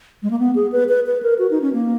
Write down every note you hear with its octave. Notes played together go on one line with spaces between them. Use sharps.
G#3
A#3
B3
G#4
B4
B4
B4
A#4
F#4
D#4
C#4
A#3